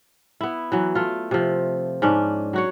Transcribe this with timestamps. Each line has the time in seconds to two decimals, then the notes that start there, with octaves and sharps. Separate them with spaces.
0.41 B3 E4
0.72 E3 F#3
0.95 A3 F4
1.31 C3 F3
2.02 G#2 C#4 D4
2.53 F#3 F#4 C#5